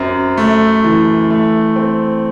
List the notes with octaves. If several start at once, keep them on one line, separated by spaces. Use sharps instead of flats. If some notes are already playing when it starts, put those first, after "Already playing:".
Already playing: F#2 C4
A3
E3
A3
C4